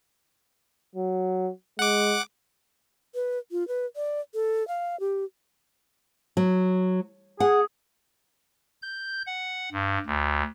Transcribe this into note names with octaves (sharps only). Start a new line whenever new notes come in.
F#3
G#3 F#5 D6
B4
F4
B4
D5
A4
F5
G4
F#3
G#4 F#5
G6
F#5
G2
D2